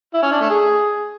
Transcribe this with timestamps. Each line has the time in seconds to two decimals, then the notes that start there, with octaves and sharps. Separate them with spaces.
0.14 E4
0.23 C#4
0.32 D4
0.41 A3
0.50 G#4